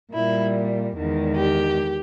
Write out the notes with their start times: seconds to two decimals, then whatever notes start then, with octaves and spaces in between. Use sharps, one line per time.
0.13 A#2 G3 E4
0.96 E2 D#3 G#3
1.36 G4